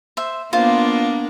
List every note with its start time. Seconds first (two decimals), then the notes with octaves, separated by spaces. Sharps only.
0.17 C5 E5
0.53 A#3 B3 D4 F4 C5